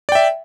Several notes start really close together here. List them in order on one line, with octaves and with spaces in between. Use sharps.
D5 G5 E5